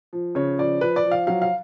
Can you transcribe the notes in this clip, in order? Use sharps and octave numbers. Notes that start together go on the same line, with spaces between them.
F3
C#3 C#5
F3 D5
F3 B4
D5
F3
F5
F#3 F5
F5